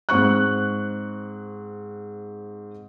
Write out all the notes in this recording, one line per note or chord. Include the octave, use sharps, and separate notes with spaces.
G#2 C4 C#6 F#6